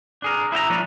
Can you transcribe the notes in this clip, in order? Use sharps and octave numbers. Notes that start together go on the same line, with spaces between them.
D4 G#4 A#4
E4 E5 G5 A#5
F3 A#3 C#4 D4